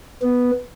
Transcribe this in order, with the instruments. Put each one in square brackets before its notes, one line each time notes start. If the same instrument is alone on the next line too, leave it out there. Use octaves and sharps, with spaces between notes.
[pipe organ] B3